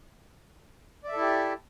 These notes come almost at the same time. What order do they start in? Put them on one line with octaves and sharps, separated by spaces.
D5 E5 A4 E4 G4